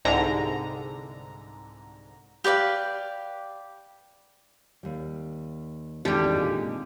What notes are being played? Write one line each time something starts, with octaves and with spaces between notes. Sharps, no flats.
C2 G#2 D3 A#5
G4 B4 D5 F5
D#2 G3
G#1 E2 D3 G3 G4
A#2 G#3